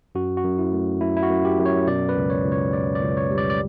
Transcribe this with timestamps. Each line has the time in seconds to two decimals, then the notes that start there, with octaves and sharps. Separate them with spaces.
0.15 F#2 F#4
0.37 F#4
0.44 F#2
0.58 E4
0.72 A3
1.01 F#2 E4
1.16 E4
1.23 F#4
1.30 F#2
1.45 G4
1.59 F#2
1.66 C#5
1.87 B2 D5
2.09 B4
2.16 C#2
2.30 C#5
2.45 C#2
2.52 C#5
2.73 C#2 D5
2.95 D5
3.03 C#2
3.17 C#5
3.31 G3
3.38 D5
3.50 D5